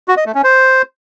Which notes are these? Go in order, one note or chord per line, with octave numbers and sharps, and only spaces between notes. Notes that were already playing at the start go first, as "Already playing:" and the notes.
F#4
D#5
A3
C#4
C5